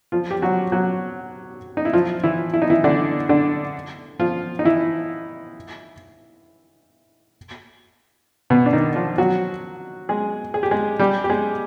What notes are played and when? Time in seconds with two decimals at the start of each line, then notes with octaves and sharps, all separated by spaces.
0.12 F3 F4
0.31 G4
0.42 F#3 F#4
0.72 F#3 F#4
1.77 D#4
1.85 E4
1.93 F3 F4
2.23 E3 E4
2.54 E4
2.62 D#4
2.70 E3 E4
2.84 D3 D4
3.29 D3 D4
4.19 F3 F4
4.59 D#4
4.65 E3 E4
8.50 B2 B3
8.66 D4
8.73 D#3 D#4
8.96 F3 F4
9.18 F#3 F#4
10.09 G#3 G#4
10.54 G#4
10.63 G4
10.71 G#3 G#4
10.99 G3 G4
11.24 G4
11.30 G#3 G#4